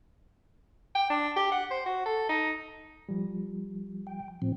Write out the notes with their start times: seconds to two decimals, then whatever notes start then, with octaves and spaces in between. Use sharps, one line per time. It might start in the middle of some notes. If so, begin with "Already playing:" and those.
0.95 G5
1.10 D4
1.36 G4
1.52 F#5
1.71 C5
1.86 F#4
2.06 A4
2.29 D#4
3.09 F3 G3
4.07 G5
4.42 A2 F3 C4